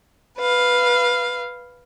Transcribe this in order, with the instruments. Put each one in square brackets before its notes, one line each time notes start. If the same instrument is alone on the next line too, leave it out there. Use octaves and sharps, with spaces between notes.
[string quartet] B4 F5